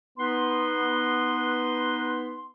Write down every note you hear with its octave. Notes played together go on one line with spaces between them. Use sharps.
B3 D#4 B4 C6